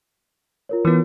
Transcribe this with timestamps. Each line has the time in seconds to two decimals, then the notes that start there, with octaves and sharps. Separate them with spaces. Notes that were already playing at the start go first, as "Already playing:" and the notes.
0.69 F4 A#4 C#5
0.85 E3 B3